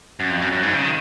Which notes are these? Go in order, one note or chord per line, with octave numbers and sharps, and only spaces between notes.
F#2
F2
F#2
F#2
G#2
C#3
D#3